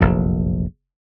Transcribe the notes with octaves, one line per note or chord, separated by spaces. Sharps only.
F1 A#1 F#2